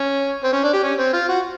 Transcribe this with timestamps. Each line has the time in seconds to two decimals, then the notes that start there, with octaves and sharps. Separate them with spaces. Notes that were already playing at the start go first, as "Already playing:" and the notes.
Already playing: C#4
0.44 C4
0.53 C#4
0.64 D4
0.73 G4
0.83 C#4
0.98 C4
1.13 F4
1.29 F#4